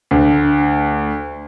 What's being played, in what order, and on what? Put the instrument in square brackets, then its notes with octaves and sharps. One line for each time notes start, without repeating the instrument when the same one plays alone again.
[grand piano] D2